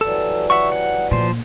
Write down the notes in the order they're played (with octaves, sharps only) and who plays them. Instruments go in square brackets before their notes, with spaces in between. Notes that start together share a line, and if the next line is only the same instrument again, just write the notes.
[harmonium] E3 F#3 G3 [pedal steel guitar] A4
[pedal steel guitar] E5 F#5 C#6
F#5
[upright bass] A#2 [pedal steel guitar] F3 C5